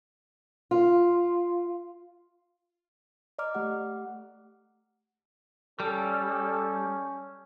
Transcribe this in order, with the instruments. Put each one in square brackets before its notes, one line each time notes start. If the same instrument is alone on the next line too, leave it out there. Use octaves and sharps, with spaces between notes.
[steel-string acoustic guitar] F4
[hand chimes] D5 D#5 A#5 D6 F6
A3 G4 F#5
[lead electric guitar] G3 [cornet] C#4 [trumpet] A4